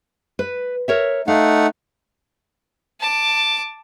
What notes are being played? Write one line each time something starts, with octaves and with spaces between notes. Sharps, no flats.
B4
A#4 C#5 E5
A3 D#4 F5 F#5
A5 D6